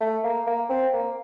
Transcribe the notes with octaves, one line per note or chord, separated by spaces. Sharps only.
A3
A#3
A#3
C4
A#3